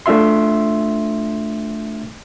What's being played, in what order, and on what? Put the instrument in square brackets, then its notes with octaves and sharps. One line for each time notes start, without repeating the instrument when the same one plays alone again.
[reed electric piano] A3 D4 F4 E5 C6